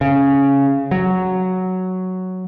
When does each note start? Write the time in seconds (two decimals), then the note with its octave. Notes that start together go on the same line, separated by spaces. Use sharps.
0.01 C#3
0.91 F#3